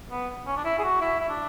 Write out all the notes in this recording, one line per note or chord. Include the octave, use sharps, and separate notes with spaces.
B3
C#4
D4
E4
G#4
F#4
E4
E4
D4